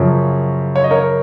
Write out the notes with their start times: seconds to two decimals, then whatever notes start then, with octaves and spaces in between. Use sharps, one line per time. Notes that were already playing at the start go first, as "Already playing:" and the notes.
Already playing: F#2 C#3 F3 A#4 C#5
0.76 C#5
0.84 D#5
0.91 A#4 C#5